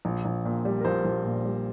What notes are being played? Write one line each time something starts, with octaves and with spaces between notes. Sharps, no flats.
A#1
A#1
A#2
G3
A#4
A#1 C5
A#1
A#2
G3